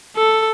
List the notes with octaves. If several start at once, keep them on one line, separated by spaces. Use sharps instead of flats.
A4